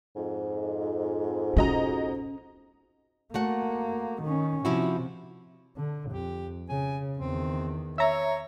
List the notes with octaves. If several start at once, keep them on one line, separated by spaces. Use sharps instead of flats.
F2 G#2
B2 C#4 D#5 A#5
A3 A#3 F#4 F#5
D#3 C#4
C3 F3 E4 F#4
D3
F2 G4
C#3 G#5
E2 D#3 C4
C#5 E5 A#5